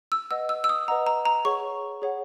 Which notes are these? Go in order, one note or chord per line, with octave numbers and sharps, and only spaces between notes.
E6
B4 D#5 F#5 E6
E6
E6
D#6
B4 D#5 F#5 A#5
A#5
A#5
G#4 C#5 F#5 C#6
G#4 C#5 F#5